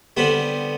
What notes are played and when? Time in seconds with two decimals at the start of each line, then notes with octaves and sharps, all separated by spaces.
0.17 D3 G3 B3 C4 B4